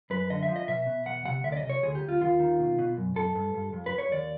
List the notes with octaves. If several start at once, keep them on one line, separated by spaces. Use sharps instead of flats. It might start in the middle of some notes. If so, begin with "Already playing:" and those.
F#2 B4
D3 D#5
E5
F3
D#5
B2 E5
B2
E2 F#5
C3 F#5
D2 E5
D5
D#5
C3
C#5
D2 G#4
G4
D2
F4
D#2 F4
D#3
B2
B2
F#2
F#2 A4
G2
G2
F2
B4
F2
C#5
D#2 D5